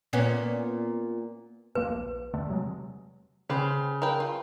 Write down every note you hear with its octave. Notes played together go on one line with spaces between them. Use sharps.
A#2 B3 C#4
D#1 F2 A#3 B4
A#1
E2 D3 A3
C3 F#3 G#3
C#3 G4 B4 C5
A#4 B4 G5
F4